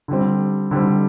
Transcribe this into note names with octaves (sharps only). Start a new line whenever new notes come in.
D3 G3 C4
D3 G3 C4